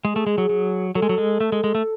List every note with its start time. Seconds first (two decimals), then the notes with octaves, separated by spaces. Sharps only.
0.04 G#3 G#4
0.16 A3
0.27 G#3
0.38 F#3
0.49 F#3
0.95 F#3 A4
1.02 G#3
1.09 F#3
1.18 G#3
1.40 A3
1.52 G#3
1.64 G#3
1.75 A3